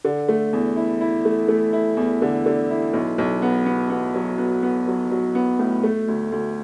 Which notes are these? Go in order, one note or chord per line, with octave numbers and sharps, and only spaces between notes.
D3
A3
E2
E4
E4
A3
A3
E4
E2
D3
D3
E4
B1
B1
B3
B3
B3
F#3
B3
B3
F#3
F#3
B3
A2
A3
D2
D2